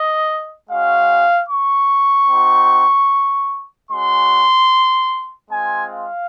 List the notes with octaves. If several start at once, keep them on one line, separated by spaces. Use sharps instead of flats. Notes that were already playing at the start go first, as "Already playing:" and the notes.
Already playing: D#5
G#3 C#4 F#4 F5
C#6
C4 D#4 F#4
G#3 C#4 F#4 C6
G#3 C4 F4 G#5
F5